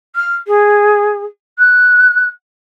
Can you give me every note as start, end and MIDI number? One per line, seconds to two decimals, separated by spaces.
0.15 0.36 89
0.47 1.23 68
1.58 2.25 90